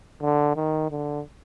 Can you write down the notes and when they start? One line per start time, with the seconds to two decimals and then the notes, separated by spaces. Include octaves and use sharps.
0.22 D3
0.56 D#3
0.91 D3